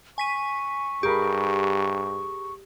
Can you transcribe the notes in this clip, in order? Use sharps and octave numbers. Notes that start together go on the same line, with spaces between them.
G#5 C#6 B6 D#7
G2 G4 G#4 A#4 B5